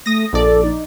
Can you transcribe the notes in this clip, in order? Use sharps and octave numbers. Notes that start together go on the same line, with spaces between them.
A3 D#6 A#6
A#1 A4 D5
D#4